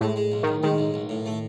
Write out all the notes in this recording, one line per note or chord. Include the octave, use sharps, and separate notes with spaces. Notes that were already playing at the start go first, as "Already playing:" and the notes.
A2 G#3
G#3
B1
B1 D#3
D#3 G#3
B1
B1
A2
A3